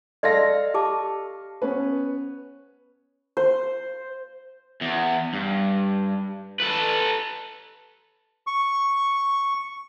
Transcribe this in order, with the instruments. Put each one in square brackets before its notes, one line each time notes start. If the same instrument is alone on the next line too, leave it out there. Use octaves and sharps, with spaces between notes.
[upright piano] A4 F5 A#6 [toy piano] D5 D#5 C6
[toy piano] G4 A5 D6
[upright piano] B3 C#4 B4
[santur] C5
[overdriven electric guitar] E2
G2
A4 B4
[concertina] C#6